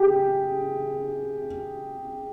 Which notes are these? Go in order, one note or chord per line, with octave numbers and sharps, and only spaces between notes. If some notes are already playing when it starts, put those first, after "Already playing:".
Already playing: G4 G#4